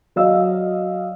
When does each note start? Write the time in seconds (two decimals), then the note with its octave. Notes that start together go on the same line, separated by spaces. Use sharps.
0.16 F#3 D5 D#5 F5 E6